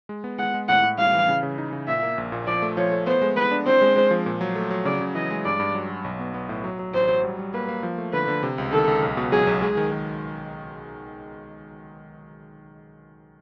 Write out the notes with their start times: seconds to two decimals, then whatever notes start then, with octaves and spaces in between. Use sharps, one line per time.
0.09 G#3
0.24 B3
0.39 G#3 F#5
0.54 G#3
0.69 A2 F#5
0.83 A2
0.98 G3 F5
1.13 E3
1.28 C#3
1.43 C#3
1.58 D#4
1.73 C#3
1.88 A#2 E5
2.03 A#3
2.18 A#1
2.32 A#2
2.47 F3 D5
2.62 A3
2.77 F3 C#5
2.92 A3
3.07 B3 C5
3.22 G#3
3.36 B3 B4
3.51 D4
3.66 C4 C5
3.81 G#3
3.96 G#3
4.11 F3
4.26 A#2
4.41 F#3
4.56 A3
4.70 F#3
4.85 C#3 D5
5.01 C#3
5.15 E3 D#5
5.30 G#3
5.45 G2 D5
5.60 G2
5.75 F#3
5.90 F#3
6.04 B1
6.20 B3
6.34 B3
6.49 A2
6.64 F#3
6.79 F#3
6.94 A1 C5
7.09 F#3
7.23 G3
7.39 G3
7.54 A#3 B4
7.69 A#3
7.83 F3
7.98 A3
8.13 D3 B4
8.28 D3
8.43 C3
8.58 C#2
8.73 D#3 A4
8.88 C#2
9.02 B1
9.17 B2
9.32 F#3 G#4
9.47 B1
9.62 G#3 G#4
9.77 D#3
9.91 D#3